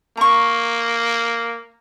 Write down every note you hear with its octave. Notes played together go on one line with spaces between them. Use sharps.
A#3 A#5 C#6